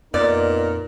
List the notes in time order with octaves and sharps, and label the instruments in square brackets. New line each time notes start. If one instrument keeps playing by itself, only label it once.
[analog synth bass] F2 [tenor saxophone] A#2 [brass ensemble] B3 D#4 A#4 [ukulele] D5